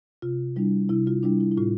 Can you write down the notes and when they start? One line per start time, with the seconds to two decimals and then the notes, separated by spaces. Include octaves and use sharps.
0.22 C3 F4
0.56 G3 D4 E4
0.89 C3 E4
1.07 F4
1.23 G3 D4 E4
1.40 E4
1.52 E4
1.58 A2 F4